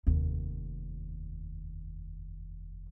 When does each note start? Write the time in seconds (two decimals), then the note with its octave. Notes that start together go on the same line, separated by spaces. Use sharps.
0.07 F1 D#2